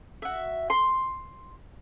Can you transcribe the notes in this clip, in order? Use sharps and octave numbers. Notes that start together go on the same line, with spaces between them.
F#4 E5
C6